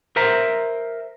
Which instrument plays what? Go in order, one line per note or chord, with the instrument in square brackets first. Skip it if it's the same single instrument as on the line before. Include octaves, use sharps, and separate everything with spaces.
[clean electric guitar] A#4 C5 E5 A#5